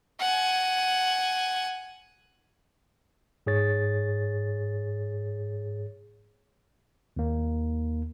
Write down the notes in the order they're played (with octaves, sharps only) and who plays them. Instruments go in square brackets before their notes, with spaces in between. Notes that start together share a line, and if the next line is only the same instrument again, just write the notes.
[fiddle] F#5 G#5
[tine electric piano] G#2 G#4 C#5 A6
D#2 A#3